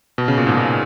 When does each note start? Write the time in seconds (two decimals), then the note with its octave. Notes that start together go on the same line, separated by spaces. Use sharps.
0.18 B2
0.28 C#3
0.38 A#2
0.47 G#2
0.57 A#2